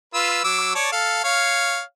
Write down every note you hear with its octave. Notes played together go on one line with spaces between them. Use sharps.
F4 B4 E6
F#3 D6 E6
C#5 D5 A5
A4 F5
C#5 F5